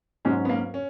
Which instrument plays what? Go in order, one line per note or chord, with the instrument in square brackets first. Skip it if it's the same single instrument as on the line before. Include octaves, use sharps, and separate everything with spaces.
[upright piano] G#2 F#3 C#4 [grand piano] G#3
[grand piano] B3
A#3
C#4